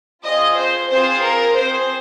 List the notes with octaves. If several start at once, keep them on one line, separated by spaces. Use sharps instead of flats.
C4 F4 G#4 D#5
C5
C4 F4 G#4 C5
A#4
C4 G#4 C5